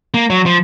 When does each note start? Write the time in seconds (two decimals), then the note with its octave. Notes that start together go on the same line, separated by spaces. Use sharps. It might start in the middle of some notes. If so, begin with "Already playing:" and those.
0.14 A#3
0.30 F#3
0.46 F3